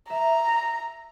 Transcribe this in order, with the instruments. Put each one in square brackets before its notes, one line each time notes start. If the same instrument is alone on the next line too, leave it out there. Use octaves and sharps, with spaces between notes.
[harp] E5 [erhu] A#5